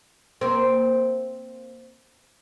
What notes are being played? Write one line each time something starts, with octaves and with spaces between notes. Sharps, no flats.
A#3 C4